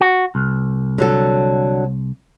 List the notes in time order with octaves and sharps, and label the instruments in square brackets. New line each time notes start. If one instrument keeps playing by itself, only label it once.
[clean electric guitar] F#4
C2
[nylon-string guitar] D3 F#3 A4